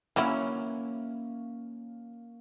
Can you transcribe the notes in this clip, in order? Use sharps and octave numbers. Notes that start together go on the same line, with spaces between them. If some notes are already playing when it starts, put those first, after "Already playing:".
E3 F#3 A#3 C#4 E4